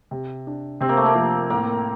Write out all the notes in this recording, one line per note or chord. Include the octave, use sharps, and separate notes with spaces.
C3
D4
C3 C4
A#3
A3
A#3
F3
A2 A#3